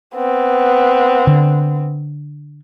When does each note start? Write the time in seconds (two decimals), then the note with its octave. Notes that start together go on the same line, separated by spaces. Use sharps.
0.15 B3 C4
1.27 D3